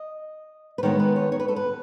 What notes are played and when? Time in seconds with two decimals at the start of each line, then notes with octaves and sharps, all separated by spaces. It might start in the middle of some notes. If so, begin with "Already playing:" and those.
Already playing: D#5
0.78 B4
0.83 D#3 G#3 B3 C#5
0.99 B4
1.16 C#5
1.32 C#5
1.40 B4
1.48 A4
1.56 B4